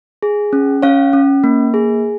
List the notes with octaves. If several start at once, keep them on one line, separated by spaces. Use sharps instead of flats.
G#4
C#4
C#4 C#5 F5
C#4
A#3
G#4